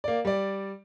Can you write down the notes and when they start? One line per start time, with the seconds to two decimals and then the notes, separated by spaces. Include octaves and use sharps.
0.04 A#3 D5
0.25 G3 D5